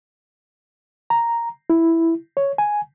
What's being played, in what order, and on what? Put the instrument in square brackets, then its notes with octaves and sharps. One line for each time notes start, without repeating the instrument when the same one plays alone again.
[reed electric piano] A#5
E4
C#5
G#5